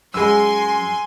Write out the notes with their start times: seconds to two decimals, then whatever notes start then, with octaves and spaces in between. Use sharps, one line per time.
0.14 F#2 G#3 G#5 C6 E6